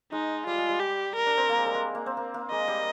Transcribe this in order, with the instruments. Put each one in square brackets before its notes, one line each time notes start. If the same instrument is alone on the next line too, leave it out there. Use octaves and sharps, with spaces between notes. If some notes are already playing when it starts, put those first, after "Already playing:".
[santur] G#3 [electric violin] D#4
[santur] G3 [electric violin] F4
[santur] G#3
G3
[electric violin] G4
A#4
[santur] D4
C4
A#3
G#3
G3
G#3
A#3
C4
A#3
A#3
[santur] G#3 [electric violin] D#5
[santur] G3